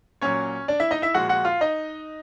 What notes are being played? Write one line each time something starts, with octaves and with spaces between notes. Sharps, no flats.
A#2 F#3 C#4 C#5
D4 D5
E4 E5
D#4 D#5
E4 E5
A#2 F3 G#3 F#4 F#5
F#4 F#5
F4 F5
D#4 D#5